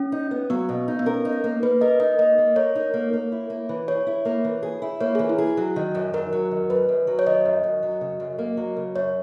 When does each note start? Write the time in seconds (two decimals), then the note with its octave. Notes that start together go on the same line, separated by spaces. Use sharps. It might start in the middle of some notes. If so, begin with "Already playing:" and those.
Already playing: C#4
0.12 D#4
0.31 B3
0.50 F#3 B3
0.69 B2
0.88 D#4
0.99 B3
1.06 C#4 A#4
1.25 D#4
1.44 A#3
1.63 A#3 B4
1.81 A#4 D#5
2.00 D#4 D#5
2.19 A#3 D#5
2.38 A#3
2.56 A#4 C#5
2.75 D#4
2.94 A#3
3.13 A#3
3.32 E4
3.50 A#3
3.69 E3
3.88 G#4 C#5
4.07 E4
4.25 A#3
4.44 E3
4.63 G#4
4.82 E4
5.00 A#3 C#5
5.15 E3 G#4
5.29 E4
5.38 G#4
5.57 F#3
5.76 D#3
5.95 F#2
6.13 F#2 A#4
6.33 F#3
6.51 D#3
6.70 F#2 B4
6.89 F#2
7.07 F#3
7.19 C#5
7.26 D#3 D#5
7.45 F#2
7.64 F#2
7.83 F#3
8.01 C#3
8.20 F#2
8.39 A#3
8.57 F#3
8.77 C#3
8.95 F#2 C#5